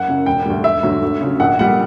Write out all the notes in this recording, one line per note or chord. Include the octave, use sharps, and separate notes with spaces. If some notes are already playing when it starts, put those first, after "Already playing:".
Already playing: F#1 F#5
F#2 C#3
E1 G5
D2 D3 G3
E1 E5
D2 D3 F#3
D2
C#3 F#3
A#1 F#5
A#2 G3 F#5